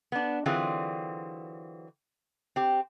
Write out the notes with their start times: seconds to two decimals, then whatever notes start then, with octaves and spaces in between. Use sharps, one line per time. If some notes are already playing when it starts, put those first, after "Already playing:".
0.12 B3 D4
0.46 D3 E3 F#3 C4 F4 G#4
2.56 C4 G4